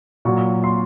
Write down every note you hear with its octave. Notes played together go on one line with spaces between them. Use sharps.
A#2 F#3 C#6
C6